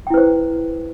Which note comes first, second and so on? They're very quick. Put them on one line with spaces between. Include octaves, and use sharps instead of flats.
G5 E4 B4 C5